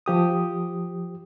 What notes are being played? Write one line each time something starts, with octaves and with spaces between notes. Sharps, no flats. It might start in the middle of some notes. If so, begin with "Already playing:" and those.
F3 G4 D#6